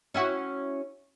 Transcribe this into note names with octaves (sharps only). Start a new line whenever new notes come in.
C#4 E4 F#4